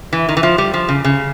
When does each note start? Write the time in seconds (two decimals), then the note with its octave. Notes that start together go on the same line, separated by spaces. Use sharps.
0.13 E3
0.29 D#3
0.37 E3
0.43 F3
0.58 G3
0.74 F3
0.89 C#3
1.04 C#3